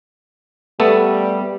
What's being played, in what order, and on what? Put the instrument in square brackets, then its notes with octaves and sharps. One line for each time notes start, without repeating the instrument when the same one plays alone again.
[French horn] G3 [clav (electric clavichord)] A3 B3 A4